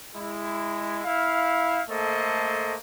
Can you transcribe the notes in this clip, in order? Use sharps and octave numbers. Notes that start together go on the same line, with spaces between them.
G#3 E4
E4 F5
A3 A#3 A4 C5 D#5